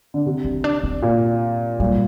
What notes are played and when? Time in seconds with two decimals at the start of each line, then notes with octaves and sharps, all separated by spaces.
0.14 D3
0.26 C3
0.45 C4
0.64 D4
0.84 C4
1.02 A#2
1.80 A#2 G3